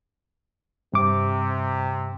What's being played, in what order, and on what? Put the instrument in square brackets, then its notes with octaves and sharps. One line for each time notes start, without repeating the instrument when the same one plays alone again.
[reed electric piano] G2 D6 [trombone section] C3